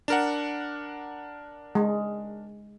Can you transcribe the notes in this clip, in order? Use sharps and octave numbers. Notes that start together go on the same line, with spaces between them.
D4 A#4 F#5
G#3